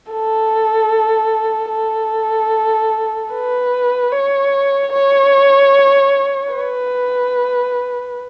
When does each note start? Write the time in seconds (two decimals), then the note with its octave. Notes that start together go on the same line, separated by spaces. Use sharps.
0.11 A4
1.72 A4
3.32 B4
4.12 C#5
4.93 C#5
6.53 B4